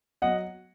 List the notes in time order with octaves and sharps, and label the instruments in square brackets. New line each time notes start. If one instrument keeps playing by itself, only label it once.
[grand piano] F#3 D#5 F#5